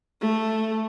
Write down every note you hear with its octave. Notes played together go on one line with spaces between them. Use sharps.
A3